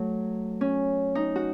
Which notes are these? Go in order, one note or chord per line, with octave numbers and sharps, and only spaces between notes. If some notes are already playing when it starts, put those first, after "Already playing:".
Already playing: F#3 A3
C#4
D#4
F#4